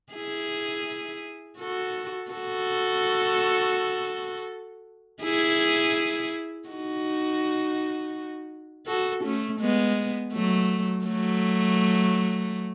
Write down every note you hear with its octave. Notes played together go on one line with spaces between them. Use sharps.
E4 G#4
F#4 A4
F#4 A4
E4 G#4
D#4 F#4
F#4 A4
A3 C#4
G#3 B3
F#3 A3
F#3 A3